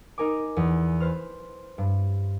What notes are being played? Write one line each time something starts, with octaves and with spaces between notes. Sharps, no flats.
D#4 A#4 G#5 D6
E2
B4 C5 F6
G2